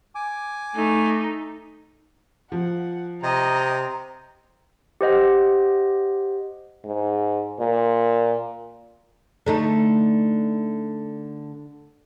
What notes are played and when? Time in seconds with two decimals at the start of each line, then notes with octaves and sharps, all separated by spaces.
0.15 G#5 D6
0.76 A3 D#4
2.52 F3 F#5
3.23 C3 D#5 A#5
5.01 G4 C5 D#5 F#5
6.85 G#2
7.59 A#2
9.46 D3 A3 D#4